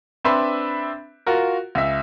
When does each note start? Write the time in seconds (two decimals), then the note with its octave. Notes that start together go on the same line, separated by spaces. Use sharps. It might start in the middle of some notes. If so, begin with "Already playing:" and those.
0.24 C4 D4 B4 E5 B5 C6
1.26 F4 F#4 A#4
1.75 C#2 E5